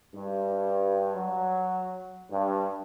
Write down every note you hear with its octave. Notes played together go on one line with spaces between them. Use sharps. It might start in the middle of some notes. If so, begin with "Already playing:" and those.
G2
F#3
G2